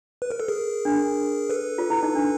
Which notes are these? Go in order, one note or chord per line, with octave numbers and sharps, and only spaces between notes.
B4
A#4
A4
G#4 A#4
D4
A4 B4
F4
E4
D#4
D4